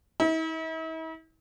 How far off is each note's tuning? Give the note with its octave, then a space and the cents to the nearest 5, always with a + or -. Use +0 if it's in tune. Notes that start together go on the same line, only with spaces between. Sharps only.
E4 -45